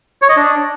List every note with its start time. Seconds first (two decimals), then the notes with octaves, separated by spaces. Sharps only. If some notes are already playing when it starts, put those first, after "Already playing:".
0.22 C#5
0.29 D#5
0.36 D4